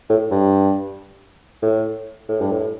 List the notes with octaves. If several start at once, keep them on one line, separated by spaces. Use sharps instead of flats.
A2
G2
A2
A2
G2
A2